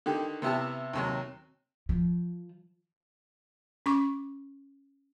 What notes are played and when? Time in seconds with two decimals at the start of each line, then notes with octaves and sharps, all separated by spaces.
0.06 D3 D#3 G4
0.42 C3 B3 E4 G4 A5
0.93 D#2 C3 F#3
1.89 F3
3.86 C#4 C#6 D6